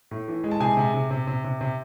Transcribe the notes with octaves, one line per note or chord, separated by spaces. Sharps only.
A2
E3
G#3
A5
C3 G#4 G#5
C3
C3
C3
C3
C3
C3